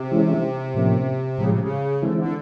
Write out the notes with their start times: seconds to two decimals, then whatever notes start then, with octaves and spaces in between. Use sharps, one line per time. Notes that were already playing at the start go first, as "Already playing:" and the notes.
Already playing: C3
0.11 E3 G#3 C#4 E4
0.74 A2 F3 A#3 C#4
1.38 A2 C#3 F3 G#3
1.49 C3
1.60 C#3
2.01 D3 E3 G#3 C4 E4
2.17 D3